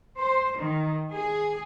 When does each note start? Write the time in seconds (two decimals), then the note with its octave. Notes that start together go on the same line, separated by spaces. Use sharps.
0.18 C5
0.59 D#3
1.13 G#4